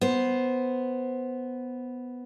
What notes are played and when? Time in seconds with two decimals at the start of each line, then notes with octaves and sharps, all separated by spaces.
0.01 B3 C5